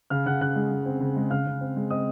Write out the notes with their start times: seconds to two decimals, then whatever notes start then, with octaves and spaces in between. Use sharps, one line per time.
0.10 C#3 F5 F6
0.26 C#3 F#5 F#6
0.41 C#3 F#5 F#6
0.56 G#3
0.71 G#3
0.86 C4
1.00 C#3
1.16 G#3
1.30 C#3 F5 F6
1.46 C#3
1.61 C4
1.76 G#3
1.90 C4 D#5 D#6